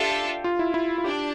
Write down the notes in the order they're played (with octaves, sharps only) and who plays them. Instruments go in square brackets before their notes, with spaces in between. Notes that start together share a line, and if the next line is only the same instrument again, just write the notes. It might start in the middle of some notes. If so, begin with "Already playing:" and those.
Already playing: [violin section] D4 F4 A4 E5 [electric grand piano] G4
[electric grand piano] F4
E4
E4
F4
[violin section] D4 [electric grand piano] G4